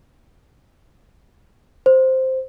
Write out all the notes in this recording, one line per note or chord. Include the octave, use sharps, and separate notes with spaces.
C5